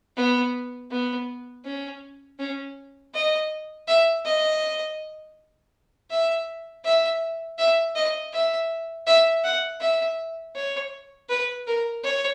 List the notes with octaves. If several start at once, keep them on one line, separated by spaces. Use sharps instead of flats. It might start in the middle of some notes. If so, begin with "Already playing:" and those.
B3
B3
C#4
C#4
D#5
E5
D#5
E5
E5
E5
D#5
E5
E5
F#5
E5
C#5
B4
A#4
C#5